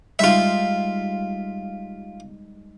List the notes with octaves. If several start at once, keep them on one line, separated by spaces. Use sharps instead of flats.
G3 G#3 D#4 F4 E5